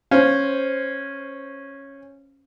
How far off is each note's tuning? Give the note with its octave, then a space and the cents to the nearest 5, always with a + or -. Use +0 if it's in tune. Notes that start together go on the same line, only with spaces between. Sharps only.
C#4 -10 C5 +0 F5 +0